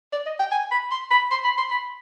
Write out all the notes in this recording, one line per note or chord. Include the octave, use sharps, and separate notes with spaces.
D5
D#5
G5
G#5
B5
C6
B5
C6
B5
C6
B5